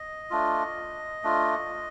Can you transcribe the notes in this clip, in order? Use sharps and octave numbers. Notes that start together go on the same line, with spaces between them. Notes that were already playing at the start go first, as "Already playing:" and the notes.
Already playing: D#5
A3 D4 F4
A3 D4 F4